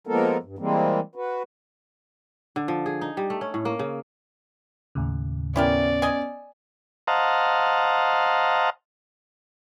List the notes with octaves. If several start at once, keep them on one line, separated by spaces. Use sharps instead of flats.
F3 G#3 A#3 B3 A4 A#4
G2
E3 G3 G#3 A#3 C4
F#4 B4
D3
F3
G#4
D#4
G3
A3
C#4
A2
A#3
C#3
D#2 A2 C#3
B3 C#4 E4 G4 A#4 D5
D#5 G#5
C5 D#5 F5 F#5 A5 A#5